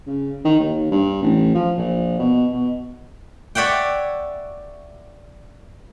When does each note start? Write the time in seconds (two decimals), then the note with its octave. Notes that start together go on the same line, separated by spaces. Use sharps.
0.07 C#3
0.45 D#3
0.60 D#2
0.91 G2
1.22 A1
1.54 F3
1.77 A#1
2.19 B2
2.53 B2
3.55 C#5 D5 E5 F#5 G5